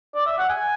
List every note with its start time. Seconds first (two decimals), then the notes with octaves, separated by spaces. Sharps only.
0.15 D5
0.26 E5
0.38 F#5
0.50 G#5